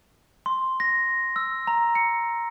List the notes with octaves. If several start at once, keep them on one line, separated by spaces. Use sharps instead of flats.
C6
A#6
E6
A#5
C#7